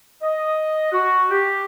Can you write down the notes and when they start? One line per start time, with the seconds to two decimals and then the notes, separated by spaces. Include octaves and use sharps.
0.22 D#5
0.92 F#4
1.30 G4